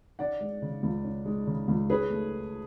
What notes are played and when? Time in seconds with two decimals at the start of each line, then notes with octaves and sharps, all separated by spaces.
0.19 C#4 D5 F#5
0.41 G#3
0.62 C#3
0.83 C#2
1.05 C#4
1.26 G#3
1.47 C#3
1.68 C#2
1.90 C#4 G#4 B4
2.10 A3